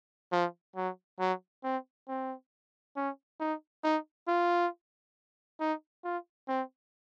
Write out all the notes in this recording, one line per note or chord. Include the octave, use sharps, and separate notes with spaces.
F3
F#3
F#3
C4
C4
C#4
D#4
D#4
F4
D#4
F4
C4